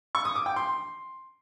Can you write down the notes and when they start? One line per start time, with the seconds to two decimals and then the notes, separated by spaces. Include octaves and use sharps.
0.15 C#6
0.25 D#6
0.36 D6
0.46 G5
0.56 C6